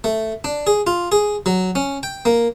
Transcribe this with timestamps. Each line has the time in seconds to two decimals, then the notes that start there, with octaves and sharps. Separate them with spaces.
0.04 A3
0.44 D4
0.67 G#4
0.87 F4
1.12 G#4
1.46 F#3
1.75 C#4
2.03 G5
2.25 A#3